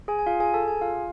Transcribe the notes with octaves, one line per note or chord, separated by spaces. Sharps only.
G#4 G#5
G#5
F4 F5
G#4 G#5
A4 A5
G#4 G#5
F4 F5